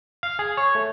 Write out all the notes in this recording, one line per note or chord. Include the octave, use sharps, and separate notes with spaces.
F5
G#4
C#5
A3